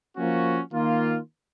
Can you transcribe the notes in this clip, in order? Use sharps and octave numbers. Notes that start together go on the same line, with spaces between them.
F3 A#3 C#4 F#4
D#3 A#3 F4